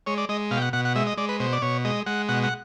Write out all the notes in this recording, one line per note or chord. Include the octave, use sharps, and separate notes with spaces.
G#3 C#5
D5
G#3 D#5
B2 F5
G5
F#5
B2 F#5
F#5
G#3 E5
D#5
G#3 D5
B4
B2 C5
D5
B2 C#5
G#3 D#5
G#3 F#5
B2 F#5
F#5